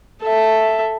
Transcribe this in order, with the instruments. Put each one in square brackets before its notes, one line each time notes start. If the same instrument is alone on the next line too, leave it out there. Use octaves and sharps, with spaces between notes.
[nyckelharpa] A4 E5